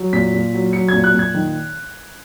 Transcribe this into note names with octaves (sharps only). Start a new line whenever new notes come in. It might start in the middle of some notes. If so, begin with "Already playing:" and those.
Already playing: F#3
A#2 B6
A#2
F#3
F#3 C#7
G#6
A#2
F#6
A#2 G#6
D#3